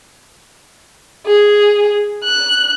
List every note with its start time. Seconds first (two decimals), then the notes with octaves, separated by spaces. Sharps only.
1.27 G#4
2.24 F#6